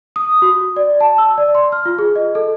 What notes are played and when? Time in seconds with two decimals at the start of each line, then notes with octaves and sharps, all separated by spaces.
0.16 D#6
0.42 F#4
0.76 D5
1.01 A5
1.18 E6
1.38 D5
1.55 C6
1.72 F6
1.86 F4
1.99 G#4
2.16 D#5
2.35 A4